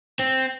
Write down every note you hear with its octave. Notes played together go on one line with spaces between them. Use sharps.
C4